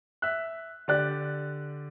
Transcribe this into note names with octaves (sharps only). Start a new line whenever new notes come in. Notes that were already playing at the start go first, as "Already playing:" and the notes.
E5 F#6
D3 G4 D5 F#6